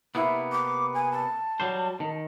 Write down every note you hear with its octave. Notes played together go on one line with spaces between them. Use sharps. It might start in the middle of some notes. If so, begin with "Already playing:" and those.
C3 A#3 B3 E4
D6
G#5
A5
F#3 G3 C5
D#3